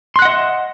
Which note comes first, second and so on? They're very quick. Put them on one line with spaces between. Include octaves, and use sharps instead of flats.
C6 F#6 F#5 D#5 E5